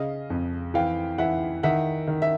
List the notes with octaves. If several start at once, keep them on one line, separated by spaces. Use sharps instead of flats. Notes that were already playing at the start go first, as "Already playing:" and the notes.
Already playing: C#3 D#5 F5
F2
E3 F5 G5
E3 E5 F#5
D#3 E5 F#5
D#3
E5